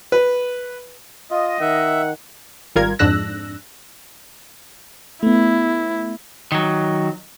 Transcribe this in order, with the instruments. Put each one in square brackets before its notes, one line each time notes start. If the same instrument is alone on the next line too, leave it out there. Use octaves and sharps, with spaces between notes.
[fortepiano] B4
[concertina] F4 [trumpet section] D#5
[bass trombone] D#3 [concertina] E5 [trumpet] F#5
[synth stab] G#1 G3 F4 A#4 G#6
F2 G#2 D4 E6 F#6 A#6
[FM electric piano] A3 B3 [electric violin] E4
[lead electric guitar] D#3 F#3